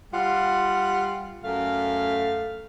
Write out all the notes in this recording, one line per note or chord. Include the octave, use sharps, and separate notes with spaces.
G3 F4 F#5
F#2 A3 F5